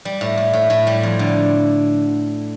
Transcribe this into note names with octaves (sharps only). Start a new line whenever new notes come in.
G3
A2
A2
A2
A2
G3
F2
D3